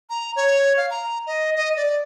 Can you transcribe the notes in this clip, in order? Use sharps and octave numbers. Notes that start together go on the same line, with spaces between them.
A#5
C#5
F5
A#5
D#5
D#5
D5